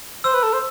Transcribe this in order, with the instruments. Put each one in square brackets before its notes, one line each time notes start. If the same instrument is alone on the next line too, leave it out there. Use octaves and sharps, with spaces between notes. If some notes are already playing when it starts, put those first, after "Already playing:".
[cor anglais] C5 [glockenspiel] E6
[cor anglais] B4
A4
C5